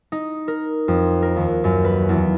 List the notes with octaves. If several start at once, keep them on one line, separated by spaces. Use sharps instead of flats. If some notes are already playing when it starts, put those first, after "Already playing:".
D#4
A#4
F2
A#4
D#2
F#2
B4
E2